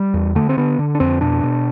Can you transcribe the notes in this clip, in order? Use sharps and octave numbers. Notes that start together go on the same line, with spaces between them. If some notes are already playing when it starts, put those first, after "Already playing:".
Already playing: G3
E2
D3 A3
C4
D3 B3
D3
D4
F2 C4
B2 D4
B2